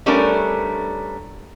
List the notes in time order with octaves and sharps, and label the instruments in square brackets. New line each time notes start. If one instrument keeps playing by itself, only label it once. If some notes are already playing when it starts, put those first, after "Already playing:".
[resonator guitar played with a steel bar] G3 A3 B3 C#4 D4 A#4